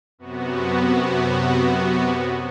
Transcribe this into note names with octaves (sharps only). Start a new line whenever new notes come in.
F#2 C3 B3 F#4